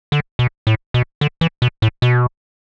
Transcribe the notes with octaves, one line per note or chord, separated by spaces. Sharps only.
D3
B2
A2
B2
D3
E3
B2
A2
B2